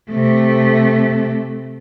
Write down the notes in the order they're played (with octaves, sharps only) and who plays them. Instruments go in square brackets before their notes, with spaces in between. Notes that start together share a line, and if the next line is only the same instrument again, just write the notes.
[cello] C3 A3